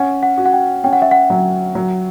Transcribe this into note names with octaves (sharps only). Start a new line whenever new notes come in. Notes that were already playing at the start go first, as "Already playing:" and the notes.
Already playing: C#4 F#5
F#5
F#4
F#5
G5
C#4 G5
F#5
E5
F#5
F#3
F#3